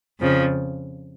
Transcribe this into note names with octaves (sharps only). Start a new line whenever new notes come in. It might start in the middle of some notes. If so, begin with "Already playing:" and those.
F2 C#3 F3